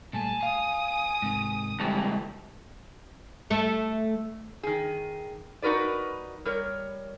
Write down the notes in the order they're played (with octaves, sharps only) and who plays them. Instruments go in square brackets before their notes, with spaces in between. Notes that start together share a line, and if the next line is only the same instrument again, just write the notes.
[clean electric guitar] A#2 G3 A3 [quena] G#5 [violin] A5
[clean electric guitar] F5 [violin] D#6
[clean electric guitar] G#2 C3 D#3
[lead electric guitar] C#2 G2 [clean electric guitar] G4 A4
[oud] A3 A4
[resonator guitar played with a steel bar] D#3 G#4
D#4 F#4 A#4 B4 D5
G3 A#4 C#5